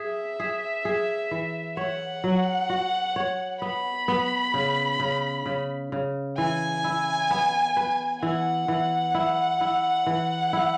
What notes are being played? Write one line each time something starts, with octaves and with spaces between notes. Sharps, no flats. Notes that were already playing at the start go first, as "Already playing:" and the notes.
Already playing: G#4 E5
G#4
G#4
E3
C#5 F#5
F#3
F#4
C#5
B3 B5
B3
C#3
C#3
C#3
C#3
E3 G#5
E4
B3
B4
E3 F#5
E3
E4
E4
E3
E4